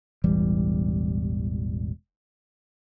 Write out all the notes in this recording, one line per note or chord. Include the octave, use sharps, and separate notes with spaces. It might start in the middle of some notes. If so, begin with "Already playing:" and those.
E1 A1 E3 G3